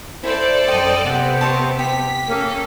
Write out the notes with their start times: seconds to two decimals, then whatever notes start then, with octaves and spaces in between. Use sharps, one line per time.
0.23 E4 A4 C5 D5
0.68 F#2 D#5 G5
1.06 C3 B3 C4 F#5
1.41 C5 C#5 A5
1.79 G4 B6
2.27 A#3 C#4 A4